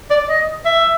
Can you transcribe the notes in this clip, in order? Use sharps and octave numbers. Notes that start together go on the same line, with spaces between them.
D5
D#5
E5